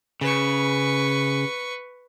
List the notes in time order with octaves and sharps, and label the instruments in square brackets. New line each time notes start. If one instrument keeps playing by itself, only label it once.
[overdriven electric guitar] C#3 [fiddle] B4 C#6